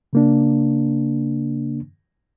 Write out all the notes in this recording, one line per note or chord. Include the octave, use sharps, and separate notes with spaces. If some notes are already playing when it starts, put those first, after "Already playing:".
C#3 A#3 D4